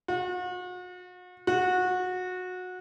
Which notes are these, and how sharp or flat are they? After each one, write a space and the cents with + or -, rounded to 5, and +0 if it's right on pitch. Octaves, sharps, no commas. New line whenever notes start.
F#4 -40
F#4 -20